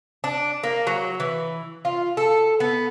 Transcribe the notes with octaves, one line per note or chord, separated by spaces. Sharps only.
D4
A#3
F#3
E3
F4
A4
B3